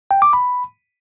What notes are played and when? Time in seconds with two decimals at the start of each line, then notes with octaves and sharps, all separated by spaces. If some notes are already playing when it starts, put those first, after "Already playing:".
0.11 G5
0.22 D6
0.33 B5